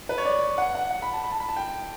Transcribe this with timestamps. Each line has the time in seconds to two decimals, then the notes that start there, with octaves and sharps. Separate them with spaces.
0.09 B4
0.18 C#5
0.25 D5
0.58 F#5
0.75 F#5
0.91 F#5
1.02 B5
1.13 A5
1.24 B5
1.32 A5
1.40 B5
1.49 A5
1.57 G5